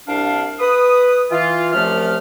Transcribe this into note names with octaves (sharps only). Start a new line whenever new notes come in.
C2 D4 F5
B4 D#6
E3 F4
C2 F#2 F3 A3 F6